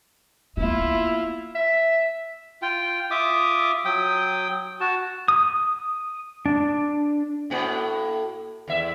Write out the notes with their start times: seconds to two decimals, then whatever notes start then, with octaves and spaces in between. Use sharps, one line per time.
0.57 A#3 B3 E4 F4
1.55 E5
2.62 F4 G5
3.11 F4 E5 D6 D#6
3.85 F#3 G5 D#6
4.80 F#4 A5
5.28 D#6
6.46 D4
7.50 A2 A#3 F#4
8.68 E2 E5